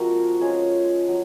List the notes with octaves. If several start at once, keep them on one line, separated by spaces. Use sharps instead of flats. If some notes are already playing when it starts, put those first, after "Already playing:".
Already playing: F3 G#3 A#3 C4 F#4 A#4
G#3 C#4 F4 C#5
F#3